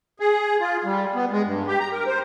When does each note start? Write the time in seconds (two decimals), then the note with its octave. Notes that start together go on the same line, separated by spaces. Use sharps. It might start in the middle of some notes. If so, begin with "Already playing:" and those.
0.20 G#4
0.60 F4
0.85 G3
1.15 B3
1.31 G#3
1.45 G2
1.67 G4
1.80 A#5
1.92 A#4
2.07 C5